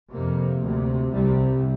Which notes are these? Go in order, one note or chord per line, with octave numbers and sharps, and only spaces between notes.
F2 C3 A#3
D2 C3
C2 C3 G3